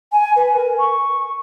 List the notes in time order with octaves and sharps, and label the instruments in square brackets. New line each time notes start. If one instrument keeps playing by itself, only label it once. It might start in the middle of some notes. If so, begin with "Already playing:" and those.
[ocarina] G#5
B4
A#4
C#6